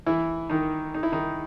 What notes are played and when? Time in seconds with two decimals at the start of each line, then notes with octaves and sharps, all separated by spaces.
0.06 E3 E4
0.50 D#3 D#4
0.94 D#4
1.03 E4
1.12 D#3 D#4